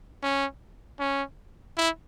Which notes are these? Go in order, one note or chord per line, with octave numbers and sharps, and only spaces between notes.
C#4
C#4
E4